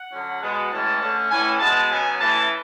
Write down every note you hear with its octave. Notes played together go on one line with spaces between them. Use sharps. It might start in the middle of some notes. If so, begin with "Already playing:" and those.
Already playing: F#5
D3 F#3 C#4
B2 G#3 B3
A2 E3 G#3 C#4 A5
D3 A3 C#4
A2 E3 A3 C#4 G#5
B2 G#3 B3 A5
C#3 F#3 B3 G#5
C#3 E3 A3 A5